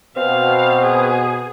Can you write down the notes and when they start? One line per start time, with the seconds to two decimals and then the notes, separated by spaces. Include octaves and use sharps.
0.16 B2 C4 F5
0.82 G#4